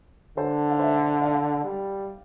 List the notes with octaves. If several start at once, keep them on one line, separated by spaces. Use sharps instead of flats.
D3 A4 C5
F5
C5 E5
D5 F5
G3